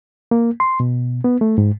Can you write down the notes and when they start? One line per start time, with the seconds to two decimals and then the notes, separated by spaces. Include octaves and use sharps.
0.31 A#3
0.60 C6
0.80 B2
1.24 B3
1.41 A3
1.58 G#2